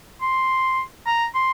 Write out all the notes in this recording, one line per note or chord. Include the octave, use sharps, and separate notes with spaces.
C6
A#5
C6